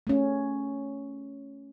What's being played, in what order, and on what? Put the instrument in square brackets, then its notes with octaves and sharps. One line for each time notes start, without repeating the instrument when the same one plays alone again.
[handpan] A3 C#4